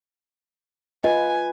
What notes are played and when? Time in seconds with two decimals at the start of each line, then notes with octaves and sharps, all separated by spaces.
1.04 F4 B4 D#5 G#5